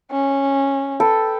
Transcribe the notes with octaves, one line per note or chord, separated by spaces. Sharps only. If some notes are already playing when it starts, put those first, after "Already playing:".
C#4
A4 B4 G5